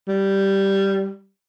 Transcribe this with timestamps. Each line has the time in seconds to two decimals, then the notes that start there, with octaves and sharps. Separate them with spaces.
0.08 G3